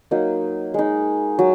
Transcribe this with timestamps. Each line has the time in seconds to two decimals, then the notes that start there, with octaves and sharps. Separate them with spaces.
0.11 F#3 A#3 D#4
0.74 G#3 D#4
1.39 F#3